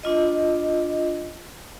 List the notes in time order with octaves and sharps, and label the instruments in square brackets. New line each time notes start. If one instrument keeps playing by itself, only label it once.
[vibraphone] D4 F4 D#5